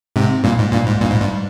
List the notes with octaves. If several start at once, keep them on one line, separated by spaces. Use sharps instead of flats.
G#2 C3
G2 A#2
G#2
G2 A#2
G#2
G2 A#2
G#2
G2